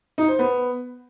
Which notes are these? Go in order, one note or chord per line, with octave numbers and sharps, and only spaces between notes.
D#4
C5
B3